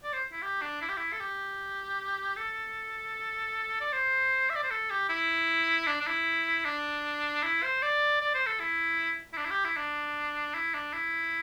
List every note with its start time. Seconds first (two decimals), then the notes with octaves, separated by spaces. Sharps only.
0.03 D5
0.13 C5
0.32 E4
0.42 G4
0.61 D4
0.82 E4
0.89 G4
0.97 E4
1.12 A4
1.20 G4
2.37 A4
3.81 D5
3.92 C5
4.50 E5
4.56 D5
4.63 C5
4.71 A4
4.90 G4
5.09 E4
5.87 D4
6.00 D4
6.07 E4
6.65 D4
7.43 E4
7.63 C5
7.82 D5
8.21 D5
8.34 C5
8.46 A4
8.60 E4
9.33 E4
9.37 D4
9.45 E4
9.51 G4
9.64 E4
9.77 D4
10.54 E4
10.74 D4
10.93 E4